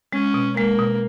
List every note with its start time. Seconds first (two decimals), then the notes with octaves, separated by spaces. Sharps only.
0.13 G#3 C#4
0.34 B2
0.57 G#3 A#3
0.79 B2